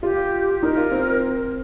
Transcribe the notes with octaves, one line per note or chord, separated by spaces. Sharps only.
F4 G4
D#4 A#4
F4
C4